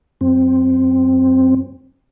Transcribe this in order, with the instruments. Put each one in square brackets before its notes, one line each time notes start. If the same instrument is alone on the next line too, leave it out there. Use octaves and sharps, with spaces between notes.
[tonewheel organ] F#2 C4